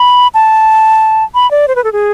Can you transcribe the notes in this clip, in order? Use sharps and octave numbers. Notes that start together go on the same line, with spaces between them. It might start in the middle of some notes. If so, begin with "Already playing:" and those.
Already playing: B5
A5
B5
D5
C5
B4
A4
G#4